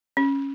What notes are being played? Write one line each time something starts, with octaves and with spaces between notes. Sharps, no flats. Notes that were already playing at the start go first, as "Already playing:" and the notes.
C#4